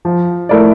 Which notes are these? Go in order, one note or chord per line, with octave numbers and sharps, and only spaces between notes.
F3
A3 E4 A#4 D5